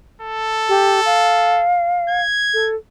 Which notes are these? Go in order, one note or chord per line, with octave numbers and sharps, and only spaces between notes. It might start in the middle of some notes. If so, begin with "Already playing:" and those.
A4
G4
F5
G#6
A4